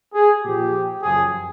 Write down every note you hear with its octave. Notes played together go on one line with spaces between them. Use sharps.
G#4
A#2 F3 G4
F#2 C#3 F3 G#4